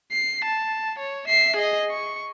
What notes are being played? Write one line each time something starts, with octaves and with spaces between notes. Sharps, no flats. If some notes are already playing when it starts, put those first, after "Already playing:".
C7
A5
C#5
E5 C7
G#4 D#5
C#6